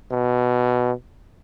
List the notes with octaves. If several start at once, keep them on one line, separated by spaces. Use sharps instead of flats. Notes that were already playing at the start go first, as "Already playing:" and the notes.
B2